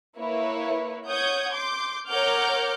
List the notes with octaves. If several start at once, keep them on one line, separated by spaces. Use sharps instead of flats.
A#3 E4 B4 C#5
C#5 F#5 D#6 G6 G#6
C6 D6 G6
A#4 C#5 F#5 D6 F6 G6